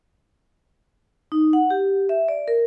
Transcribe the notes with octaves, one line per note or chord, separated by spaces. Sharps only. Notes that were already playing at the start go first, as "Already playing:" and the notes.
D#4
F#5
G4
E5
D5
A#4